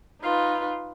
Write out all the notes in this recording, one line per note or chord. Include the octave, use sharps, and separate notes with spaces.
D#4 F4 B4